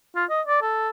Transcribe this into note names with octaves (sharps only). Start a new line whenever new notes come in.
F4
D#5
D5
A4